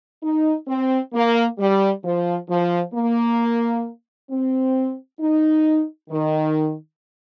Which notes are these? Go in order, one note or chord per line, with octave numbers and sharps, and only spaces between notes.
D#4
C4
A#3
G3
F3
F3
A#3
C4
D#4
D#3